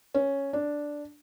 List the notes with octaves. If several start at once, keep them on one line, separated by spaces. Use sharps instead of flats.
C#4
D4